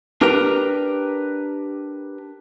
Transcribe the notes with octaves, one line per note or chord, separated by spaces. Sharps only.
D4 G4 A#4 B4 G5 A#5